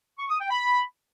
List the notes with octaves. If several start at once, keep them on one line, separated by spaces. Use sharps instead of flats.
C#6
D#6
G5
B5